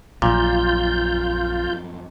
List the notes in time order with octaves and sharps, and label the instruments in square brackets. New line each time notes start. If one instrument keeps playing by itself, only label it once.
[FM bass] A#1 [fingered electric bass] F#2 F3 F#3 [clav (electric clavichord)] A#2 [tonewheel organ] F4 G6